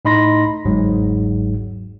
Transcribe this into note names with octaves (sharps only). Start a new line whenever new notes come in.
A2 D#4 D#5 B5 C6 A#6
G1 E2 G#2 F#3